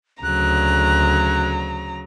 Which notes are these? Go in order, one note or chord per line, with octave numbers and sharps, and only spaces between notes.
D2 C#3 F#3 A#5 F#6